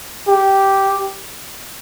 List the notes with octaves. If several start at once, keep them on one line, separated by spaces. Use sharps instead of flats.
G4